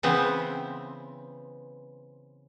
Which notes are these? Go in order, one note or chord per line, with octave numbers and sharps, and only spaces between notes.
C#3 E3 B3 C4